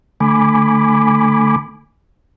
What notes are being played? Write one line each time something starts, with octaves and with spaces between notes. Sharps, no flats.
D3 A3 G#5 B5 D6